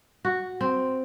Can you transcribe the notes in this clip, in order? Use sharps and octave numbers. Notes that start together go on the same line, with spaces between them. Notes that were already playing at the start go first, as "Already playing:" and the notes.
F#4
C4